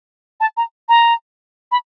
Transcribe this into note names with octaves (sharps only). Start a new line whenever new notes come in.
A5
A#5
A#5
B5